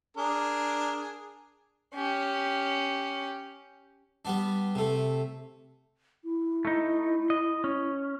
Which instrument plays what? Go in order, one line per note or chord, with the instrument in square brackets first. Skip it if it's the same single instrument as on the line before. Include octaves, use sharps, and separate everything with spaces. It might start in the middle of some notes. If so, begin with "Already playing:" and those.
[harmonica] D4 G#4 A#4
[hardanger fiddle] C#4 G4
[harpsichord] G3 B3 D4
C3 A3
[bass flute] E4
[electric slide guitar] A3 D#4
D#5
C#4